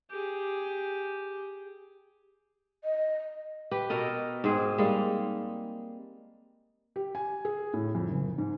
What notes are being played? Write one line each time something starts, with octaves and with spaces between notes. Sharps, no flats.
G4 G#4
D#5
G4 B4
B2 A4 A#4 D#5
G#2 C4 G#4
G3 G#3 A#3 D#4
G4
G#5
G#4
A2
F2
F#1
G#2